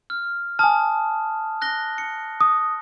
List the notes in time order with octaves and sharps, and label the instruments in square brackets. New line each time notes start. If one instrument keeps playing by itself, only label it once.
[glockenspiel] F6
[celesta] G#5 F6 [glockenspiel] A5 D#6
[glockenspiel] F#6 A#6 G7
C#7
[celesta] D#6